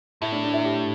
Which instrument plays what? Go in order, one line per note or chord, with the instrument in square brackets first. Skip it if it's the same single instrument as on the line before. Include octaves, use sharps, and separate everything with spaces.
[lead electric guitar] A2 [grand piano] E4
[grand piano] D4
D4
E4
G4